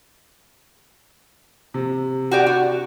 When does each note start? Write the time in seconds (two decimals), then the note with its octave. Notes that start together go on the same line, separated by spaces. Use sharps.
1.74 C3
2.31 F#4 G4 D5
2.47 F#4